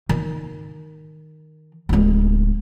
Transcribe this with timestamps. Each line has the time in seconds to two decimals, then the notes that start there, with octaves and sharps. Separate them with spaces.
0.09 D#3
1.89 D1 G#3